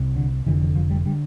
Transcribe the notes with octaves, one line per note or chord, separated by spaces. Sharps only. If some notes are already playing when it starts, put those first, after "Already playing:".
Already playing: C2 C3
D3
F1 F2 D3 E3
E3
F3
G3
D3 G3